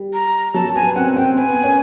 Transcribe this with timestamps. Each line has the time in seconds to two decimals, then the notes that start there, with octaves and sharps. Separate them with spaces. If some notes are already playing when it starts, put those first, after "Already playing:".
Already playing: G3
0.14 A#5
0.54 F#3 A5
0.75 B3 G#5
0.96 C4 F#5
1.16 C4 G5
1.36 B3 G#5
1.64 C#4